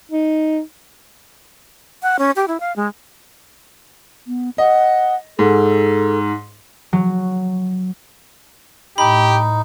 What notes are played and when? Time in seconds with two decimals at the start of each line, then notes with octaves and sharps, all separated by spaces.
0.11 D#4
2.03 F#5
2.19 C#4
2.36 G4
2.48 E4
2.60 F5
2.76 G#3
4.27 B3
4.58 D#5 F#5
5.39 G#2 A4
6.93 F#3
8.98 A2 D#4 G4 B5